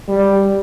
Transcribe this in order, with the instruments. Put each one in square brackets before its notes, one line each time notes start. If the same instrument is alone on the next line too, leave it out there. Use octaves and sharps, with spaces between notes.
[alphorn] G3